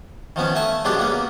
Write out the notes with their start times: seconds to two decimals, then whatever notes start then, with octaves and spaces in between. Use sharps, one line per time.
0.36 D#3 F3 B3 C#4
0.55 A3 G#5 A5
0.85 F#3 G#3 B3 D4 G4 G#4
0.97 C#3 A#3 B3